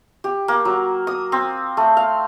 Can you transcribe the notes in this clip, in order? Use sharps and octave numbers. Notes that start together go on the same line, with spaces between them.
G4
A#3
F#3
D#6
C4
A3
F5